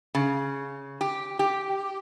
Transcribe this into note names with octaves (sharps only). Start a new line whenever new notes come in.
C#3
G4
G4